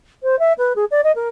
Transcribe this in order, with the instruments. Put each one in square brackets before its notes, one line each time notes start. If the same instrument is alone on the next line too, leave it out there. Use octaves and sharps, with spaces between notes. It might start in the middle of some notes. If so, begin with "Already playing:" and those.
[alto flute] C5
E5
B4
G#4
D5
D#5
A#4